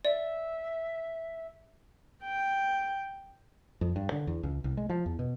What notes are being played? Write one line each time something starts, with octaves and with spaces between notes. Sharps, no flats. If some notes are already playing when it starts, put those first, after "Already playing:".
D5 E5
G5
F2
G2
D3
E2
C#2
C2
G#3
F3
E2
B2